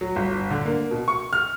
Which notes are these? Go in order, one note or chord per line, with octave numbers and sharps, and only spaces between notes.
F#3
G1
D3
A#3
B2
C#6
F6